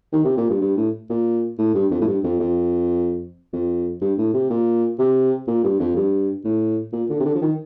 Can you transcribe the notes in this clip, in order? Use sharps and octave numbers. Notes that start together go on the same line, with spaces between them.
D#3
C3
A#2
G2
G2
A2
A#2
A2
G2
F2
A2
G2
F2
F2
F2
G2
A2
C3
A#2
C3
A#2
G2
F2
G2
A2
A#2
D3
C3
D3
F3
D#3